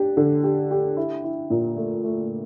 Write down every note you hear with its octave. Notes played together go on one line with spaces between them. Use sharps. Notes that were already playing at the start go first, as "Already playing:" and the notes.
Already playing: D4 G4
D3
G4
G4
E4
E4
A#2
A3
A3